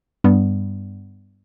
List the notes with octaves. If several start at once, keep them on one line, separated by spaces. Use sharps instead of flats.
G2 G3 B3